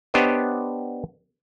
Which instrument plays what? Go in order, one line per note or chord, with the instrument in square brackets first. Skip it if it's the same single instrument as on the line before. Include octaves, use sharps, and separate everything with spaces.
[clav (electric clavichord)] B3 D4 G4 C5 C#5 D#5